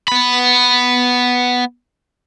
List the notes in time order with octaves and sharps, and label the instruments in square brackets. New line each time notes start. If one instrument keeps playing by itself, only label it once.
[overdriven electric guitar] B3 B5